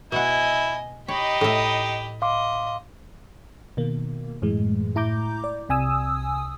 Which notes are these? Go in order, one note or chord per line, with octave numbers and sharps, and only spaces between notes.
B2 E4 D#5 F#5 G#5
D#4 G4 C#5 D#5 B5
A2 E5
D#5 F5 C6 D6
B2 D#3 A#3
F#2 A2 E3 G#3
A2 E4 A#5 D6 G6
D5
C2 C3 G#5 D#6 E6